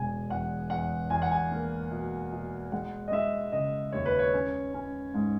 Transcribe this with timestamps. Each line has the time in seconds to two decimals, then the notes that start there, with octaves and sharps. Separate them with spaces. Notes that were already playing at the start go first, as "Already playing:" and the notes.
Already playing: E1 B2 G#5
0.29 E2 F#5
0.70 E2 F#5
1.10 E2 G#5
1.22 F#5
1.31 G#5
1.51 A#3
1.92 B2
2.32 B2
2.72 G#3 F#5
3.08 D#5
3.12 G#3 E5
3.52 C#3 D#5
3.92 D#2 C#5
4.06 B4
4.19 C#5
4.34 C#4
4.74 C#4
5.14 G#2